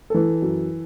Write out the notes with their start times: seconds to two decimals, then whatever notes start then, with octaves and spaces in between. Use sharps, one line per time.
0.10 E3 A4
0.42 F#2